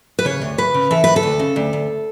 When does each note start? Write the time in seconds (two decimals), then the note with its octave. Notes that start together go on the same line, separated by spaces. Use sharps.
0.19 B4
0.25 C#3 C#5
0.42 D2
0.58 C#3 B4
0.74 C#3
0.91 E3 A4
1.04 D2 B4
1.16 A4
1.23 D2
1.39 C#3
1.56 D2
1.73 D2